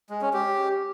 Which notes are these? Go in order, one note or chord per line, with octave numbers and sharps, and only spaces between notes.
G#3
C#4
G4